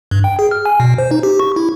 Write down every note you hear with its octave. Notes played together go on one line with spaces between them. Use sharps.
G2
G5
G#4
F6
G#5
B2
C5
D#4
G4
C#6
E4